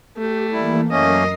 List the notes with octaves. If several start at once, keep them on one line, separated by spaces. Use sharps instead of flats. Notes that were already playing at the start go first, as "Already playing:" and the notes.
A3 G4
E3 G3 A#3 E4
F#2 A3 A#3 C#4 A#4 D#5 C7